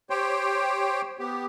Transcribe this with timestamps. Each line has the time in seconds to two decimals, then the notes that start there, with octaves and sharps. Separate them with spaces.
0.10 G4 C5 C#5 G5
1.19 B3 G4